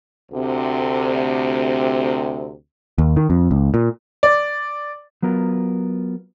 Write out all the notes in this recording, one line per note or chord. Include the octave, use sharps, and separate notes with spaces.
D2 C3
D#2
D#3
F2
C#2
A#2
D5
F#3 B3 F4 A#4